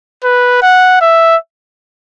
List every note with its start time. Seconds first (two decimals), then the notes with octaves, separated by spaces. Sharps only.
0.24 B4
0.62 F#5
1.01 E5